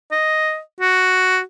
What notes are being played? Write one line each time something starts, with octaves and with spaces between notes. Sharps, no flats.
D#5
F#4